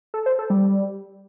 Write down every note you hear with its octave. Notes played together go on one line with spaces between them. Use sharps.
A4
C5
A4
G3